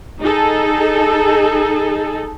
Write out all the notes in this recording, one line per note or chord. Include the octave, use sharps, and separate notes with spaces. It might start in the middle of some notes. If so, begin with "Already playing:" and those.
D#4 G#4 A4